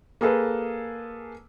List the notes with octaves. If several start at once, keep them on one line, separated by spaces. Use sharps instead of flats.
A#3 G#4 A4 B4